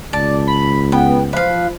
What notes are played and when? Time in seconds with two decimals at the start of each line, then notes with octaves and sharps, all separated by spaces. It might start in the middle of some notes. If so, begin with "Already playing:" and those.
0.13 C#2 D5 A5
0.47 B5
0.92 B3 G5
1.33 F3 B4 F5